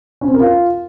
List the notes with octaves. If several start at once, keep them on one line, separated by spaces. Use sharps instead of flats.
C#4
C4
A#4
F4